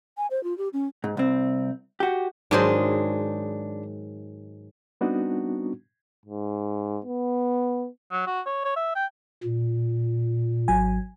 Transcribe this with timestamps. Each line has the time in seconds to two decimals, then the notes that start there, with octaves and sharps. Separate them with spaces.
0.17 G#5
0.31 C5
0.44 F4
0.58 G4
0.73 C#4
1.04 G#2
1.17 C2 C4
2.00 F#4 G4
2.51 G#2 D#3 F#3 D4 G#4 C5
5.01 G3 B3 C4 D4 D#4 F#4
6.26 G#2
7.05 B3
8.11 F#3
8.27 F#4
8.46 C#5
8.65 C#5
8.76 E5
8.96 G5
9.44 A#2
10.68 G#1 F#3 G#5